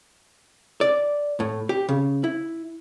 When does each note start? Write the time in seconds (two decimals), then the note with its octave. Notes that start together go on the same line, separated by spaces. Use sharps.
0.81 D5
1.40 A2
1.69 G4
1.89 C#3
2.24 E4